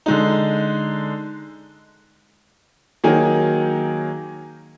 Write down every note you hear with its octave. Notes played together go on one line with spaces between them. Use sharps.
D3 G#3 D#4
D#3 F#3 A#3 D#4 G#4